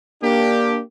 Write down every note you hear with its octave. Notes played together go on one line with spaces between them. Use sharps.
A#3 D4 G4